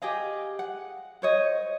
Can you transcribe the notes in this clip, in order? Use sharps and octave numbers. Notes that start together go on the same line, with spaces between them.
G4 G#4 D#5 F5
F#5
C5 C#5 D#5